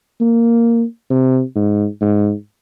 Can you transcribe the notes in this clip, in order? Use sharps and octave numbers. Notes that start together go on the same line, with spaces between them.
A#3
C3
G#2
G#2